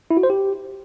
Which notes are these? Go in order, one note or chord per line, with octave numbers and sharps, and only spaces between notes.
E4
F#4
C5
G4